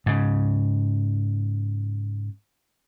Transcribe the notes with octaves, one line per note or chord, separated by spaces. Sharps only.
G#2 C#3